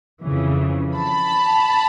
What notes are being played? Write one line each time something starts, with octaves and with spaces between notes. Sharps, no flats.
F2 C#3 E3
A5 B5